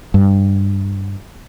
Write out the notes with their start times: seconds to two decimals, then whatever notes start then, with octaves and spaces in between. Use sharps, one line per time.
0.14 G2